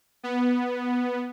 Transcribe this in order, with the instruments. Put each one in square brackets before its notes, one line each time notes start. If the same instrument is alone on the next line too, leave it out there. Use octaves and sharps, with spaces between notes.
[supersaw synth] B3